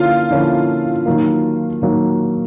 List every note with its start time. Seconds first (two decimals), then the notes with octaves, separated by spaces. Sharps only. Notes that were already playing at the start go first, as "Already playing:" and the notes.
Already playing: D3 F3 A#3 C#4 E4 F4
0.30 D3 F3 A#3 C#4 E4
1.06 D#3 F#3 A#3
1.82 D#3 F#3 A#3